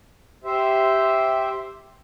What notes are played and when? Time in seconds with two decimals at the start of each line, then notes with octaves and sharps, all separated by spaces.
0.44 G4 C5 E5